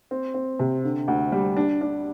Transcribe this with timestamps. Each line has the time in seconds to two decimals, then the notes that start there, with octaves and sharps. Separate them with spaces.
0.11 C4
0.34 C4
0.60 C3
0.84 D3
1.08 D2
1.32 G3
1.57 D4
1.81 D4